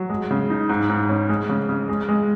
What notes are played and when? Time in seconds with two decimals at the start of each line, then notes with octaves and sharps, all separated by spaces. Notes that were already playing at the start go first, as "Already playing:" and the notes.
Already playing: F#3
0.10 G#3
0.31 C#3
0.50 D#4
0.69 G#2
0.89 G#2
1.09 C#4
1.29 G#3
1.49 C#3
1.69 C#3
1.89 G#3
2.09 G#3